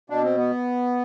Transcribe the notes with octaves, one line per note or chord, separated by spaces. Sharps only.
B2 D4
C4
B3